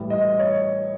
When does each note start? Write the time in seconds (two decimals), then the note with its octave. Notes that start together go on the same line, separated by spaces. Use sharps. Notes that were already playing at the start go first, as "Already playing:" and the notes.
Already playing: A2 E3 G3
0.10 D#5
0.39 C#5